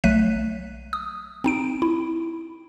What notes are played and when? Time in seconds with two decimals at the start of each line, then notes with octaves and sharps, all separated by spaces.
0.04 B1 F#3 A3 F#6 B6 D#7
0.93 D#6
1.44 C4 D#4 D7
1.82 E4